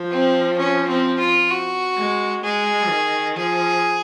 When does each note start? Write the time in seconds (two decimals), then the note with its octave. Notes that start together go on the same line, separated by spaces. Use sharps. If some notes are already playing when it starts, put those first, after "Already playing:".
Already playing: F3
0.11 C4
0.58 C#4
0.88 C4
1.20 F4
1.50 F#4
1.97 G#3
2.44 G#3 G#4
2.89 D#3
3.36 F3 G#4